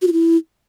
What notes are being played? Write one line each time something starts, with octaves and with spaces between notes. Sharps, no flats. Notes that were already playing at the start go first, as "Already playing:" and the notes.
F#4
F4
E4